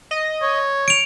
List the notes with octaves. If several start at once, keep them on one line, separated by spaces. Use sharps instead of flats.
D#5
C#5
C#7 D7 F7